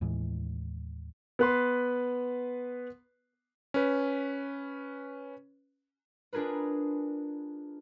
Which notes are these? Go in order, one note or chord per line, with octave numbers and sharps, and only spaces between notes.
D#2 A2 E3 G#3
B3 B4 C6
C#4 B4
D4 F4 G#4 A#4 B4